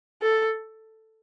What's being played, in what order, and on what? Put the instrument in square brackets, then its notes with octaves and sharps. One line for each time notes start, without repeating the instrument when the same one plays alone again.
[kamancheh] A4